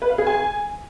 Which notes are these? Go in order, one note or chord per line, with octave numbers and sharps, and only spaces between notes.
B4
F5
G#4
G#5